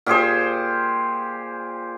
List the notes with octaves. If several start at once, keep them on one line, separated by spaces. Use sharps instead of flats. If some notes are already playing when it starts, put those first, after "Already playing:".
A#2 G4 G#4 C5